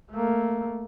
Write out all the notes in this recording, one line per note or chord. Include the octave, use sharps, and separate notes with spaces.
A3 A#3